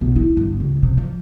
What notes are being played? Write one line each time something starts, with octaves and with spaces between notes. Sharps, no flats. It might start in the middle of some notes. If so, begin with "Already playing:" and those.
B1
E4
G1
C#2
C3
F3